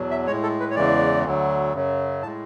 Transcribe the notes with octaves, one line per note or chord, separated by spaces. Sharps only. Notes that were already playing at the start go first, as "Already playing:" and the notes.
Already playing: E2 B2 F#3
E5
A2 G#3 C#5
A4
B4
C#5
E2 C#3 E3 G#3 D5
D2 D3 F#3
F#2 C#3 F#3
A2 G#3 A5